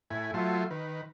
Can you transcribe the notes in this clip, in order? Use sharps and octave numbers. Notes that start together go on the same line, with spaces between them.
A2 E4 G#5
F#3 A3 F4 E5 C6
D#3 B4